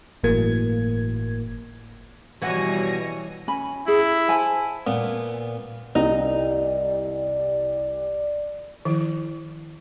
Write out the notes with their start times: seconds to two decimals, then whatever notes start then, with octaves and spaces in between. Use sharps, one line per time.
0.23 G1 A2 E3 F#3 A#3 G#6
2.42 B2 E3 F3 G3 F#4 C#5 G#5 A#6
3.48 C#4 G#5 B5
3.88 E4 G#4
4.28 C5 G#5 A5
4.87 A#2 B3
5.95 C2 D#4 D5
8.85 D#3 F3 E4